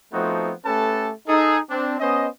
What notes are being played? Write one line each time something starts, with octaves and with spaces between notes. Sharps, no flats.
F3 A3 B3 C4 D#4 F#4
A3 C#4 G4 A4 B4 A5
D#4 G#4 A4
C4 D4
B3 C#4 C5 D#5